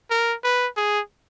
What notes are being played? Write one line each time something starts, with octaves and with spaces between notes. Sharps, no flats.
A#4
B4
G#4